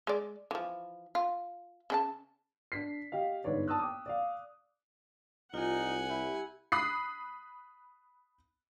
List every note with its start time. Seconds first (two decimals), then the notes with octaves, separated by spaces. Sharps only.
0.07 G#3 D5
0.51 E3 F3
1.15 F4
1.90 C#3 D4 A5
2.72 D4 B6 C7
3.12 G4 D#5 F5
3.44 G1 G#2 B3 C#5 D5
3.68 A5 D#6 E6 F#6
3.79 G5 D6 D#6
4.06 D5 F5
5.54 C2 D#4 F4 F#5 G#5
6.09 E4 G4
6.72 B5 D#6 F#6 C7